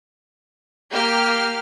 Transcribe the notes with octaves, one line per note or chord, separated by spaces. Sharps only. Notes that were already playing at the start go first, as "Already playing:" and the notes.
A#3 G4 F6